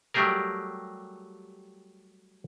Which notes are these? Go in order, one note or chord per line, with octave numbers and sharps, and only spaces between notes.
F#3 G3 A3 G4 G#4 A#4